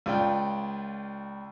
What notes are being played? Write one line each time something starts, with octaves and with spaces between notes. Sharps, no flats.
C#2 F4 D5 G5